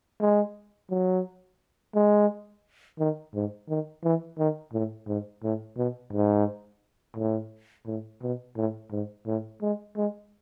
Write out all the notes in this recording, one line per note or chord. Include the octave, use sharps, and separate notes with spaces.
G#3
F#3
G#3
D#3
G#2
D#3
E3
D#3
A2
G#2
A2
B2
G#2
A2
A2
B2
A2
G#2
A2
G#3
G#3